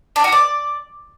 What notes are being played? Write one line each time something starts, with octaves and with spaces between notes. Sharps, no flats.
D4
F#4
D5